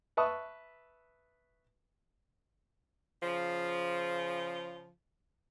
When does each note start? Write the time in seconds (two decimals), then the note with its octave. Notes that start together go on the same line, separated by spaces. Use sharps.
0.17 B4 E5 A5 C#6 D#6
3.23 C#3 F3